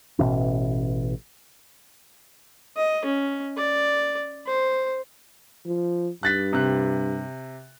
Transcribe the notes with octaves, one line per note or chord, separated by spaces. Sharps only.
A1 B2 E3 C#4
D#5
C#4
D5
C5
F3
G2 F#6 A6 B6
C3 F#6